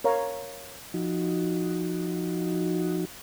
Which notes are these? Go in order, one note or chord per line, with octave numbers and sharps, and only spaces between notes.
A#4 C#5 F5 A#5
F3 D#4 F#4